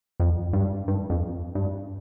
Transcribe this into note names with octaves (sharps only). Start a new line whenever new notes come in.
F2
G2
G2
F2
G2